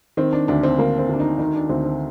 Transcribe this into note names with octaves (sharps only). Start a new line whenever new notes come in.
D#3 C4
D4
D2 D4
C4
D2 A#3
C4
D2 D4
D#4
D#3 D#4
D4
D2 C4
C4